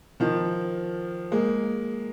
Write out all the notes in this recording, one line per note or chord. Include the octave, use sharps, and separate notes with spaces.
D#3 F3
G#3 A#3